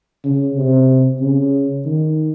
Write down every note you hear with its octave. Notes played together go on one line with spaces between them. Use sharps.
C#3
C3
C#3
D#3